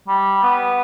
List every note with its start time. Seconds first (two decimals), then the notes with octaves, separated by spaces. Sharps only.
0.08 G3
0.43 B3